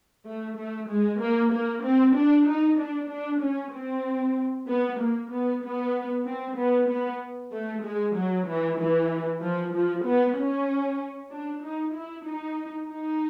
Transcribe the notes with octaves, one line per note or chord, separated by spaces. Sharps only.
A3
A3
G#3
A#3
A#3
C4
D4
D#4
D4
D4
C#4
C4
B3
A#3
B3
B3
C4
B3
B3
A3
G#3
F#3
E3
E3
F3
F3
B3
C#4
D4
D#4
E4
D#4
D#4